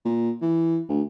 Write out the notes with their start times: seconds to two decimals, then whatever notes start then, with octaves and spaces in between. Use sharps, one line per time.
0.05 A#2
0.41 E3
0.89 D2